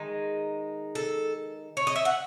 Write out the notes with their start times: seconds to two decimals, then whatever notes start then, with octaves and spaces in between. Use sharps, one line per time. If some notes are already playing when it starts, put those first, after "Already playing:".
Already playing: D#3 G#3 D#4
0.95 A4
1.77 C#5
1.87 D#5
1.96 E5
2.05 F#5